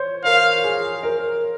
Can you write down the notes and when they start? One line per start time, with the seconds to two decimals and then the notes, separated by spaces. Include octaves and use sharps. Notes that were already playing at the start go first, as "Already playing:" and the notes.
Already playing: C5 C#5
0.24 A#4 F5
0.64 G#4
1.03 A#4